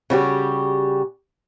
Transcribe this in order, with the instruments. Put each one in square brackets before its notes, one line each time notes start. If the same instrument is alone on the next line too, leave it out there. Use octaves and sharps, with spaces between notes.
[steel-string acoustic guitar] C#3 G3 F#4 G4